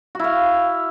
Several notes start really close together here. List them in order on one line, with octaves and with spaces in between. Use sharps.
F#4 E4 F5